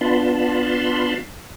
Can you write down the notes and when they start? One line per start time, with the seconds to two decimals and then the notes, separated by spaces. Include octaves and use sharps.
0.01 B3 D4 F4 A5 B5 C6